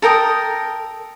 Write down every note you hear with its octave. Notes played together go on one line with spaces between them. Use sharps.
A4 A#4 G5 D#6